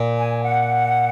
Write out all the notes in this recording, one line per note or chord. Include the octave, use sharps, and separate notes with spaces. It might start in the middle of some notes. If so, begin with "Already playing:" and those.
Already playing: A#2
G#5
F#5